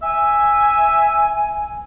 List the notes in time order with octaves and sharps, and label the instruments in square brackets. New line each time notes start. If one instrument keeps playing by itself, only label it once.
[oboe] E5 [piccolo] G#5